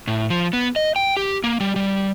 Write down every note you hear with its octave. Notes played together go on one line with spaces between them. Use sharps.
A2
F3
B3
D#5
G5
G4
A#3
G3
G3